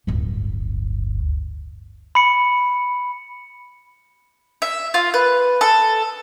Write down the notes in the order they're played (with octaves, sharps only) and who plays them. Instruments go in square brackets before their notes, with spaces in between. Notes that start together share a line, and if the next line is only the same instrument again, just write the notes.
[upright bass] D1 G1
[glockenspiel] B5 C#7
[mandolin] E5
F4
B4
A4